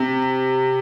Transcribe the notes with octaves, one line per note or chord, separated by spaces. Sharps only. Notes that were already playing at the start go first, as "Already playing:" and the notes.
Already playing: C3